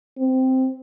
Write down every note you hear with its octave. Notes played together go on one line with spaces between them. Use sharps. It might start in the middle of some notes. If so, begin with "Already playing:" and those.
C4